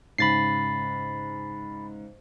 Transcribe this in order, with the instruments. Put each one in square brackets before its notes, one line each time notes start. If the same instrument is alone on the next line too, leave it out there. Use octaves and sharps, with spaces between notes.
[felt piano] G#2 C#3 [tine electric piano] B5 A6 C7